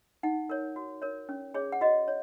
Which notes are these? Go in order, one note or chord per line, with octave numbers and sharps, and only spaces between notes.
D#4 F#5
A#4 C#5
F#4
A#4 C#5
C#4
G#4 C#5
F#5
F#4 D#5
C#5